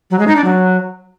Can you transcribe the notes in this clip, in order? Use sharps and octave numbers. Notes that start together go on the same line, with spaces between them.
F#3
G#3
D#4
D4
F#3